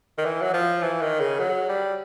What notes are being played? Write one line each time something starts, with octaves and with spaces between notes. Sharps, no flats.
D#3
E3
F#3
F3
E3
D#3
C#3
F#3
G3